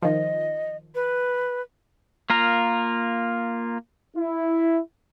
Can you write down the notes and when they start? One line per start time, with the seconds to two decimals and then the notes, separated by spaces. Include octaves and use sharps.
0.02 D#3 F3 D#5
0.95 B4
2.30 A#3 F4 A#4
4.16 E4